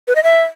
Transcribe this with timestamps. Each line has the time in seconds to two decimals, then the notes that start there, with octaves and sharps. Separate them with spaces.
0.08 B4
0.15 D#5
0.23 E5